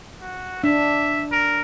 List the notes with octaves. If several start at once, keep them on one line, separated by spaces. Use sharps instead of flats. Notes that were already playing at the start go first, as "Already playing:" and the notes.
F#4
D4 E5
A#4